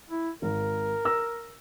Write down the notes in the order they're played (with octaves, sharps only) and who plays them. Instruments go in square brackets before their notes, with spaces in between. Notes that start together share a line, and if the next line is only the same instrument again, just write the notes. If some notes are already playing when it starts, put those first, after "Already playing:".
[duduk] E4
[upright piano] G#1 [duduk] A#4
[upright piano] E6 A#6